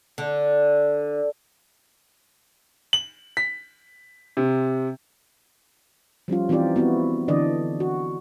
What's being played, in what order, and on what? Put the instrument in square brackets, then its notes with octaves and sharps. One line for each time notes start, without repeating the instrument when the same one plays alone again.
[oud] D3
[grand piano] F#7
B6
C3
[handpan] F3 G3 C#4 F4
E3 C4 D#4 F4 G4 D5
B3 C4 E4 F#4
D3 E3 D4 D5 D#5
F#4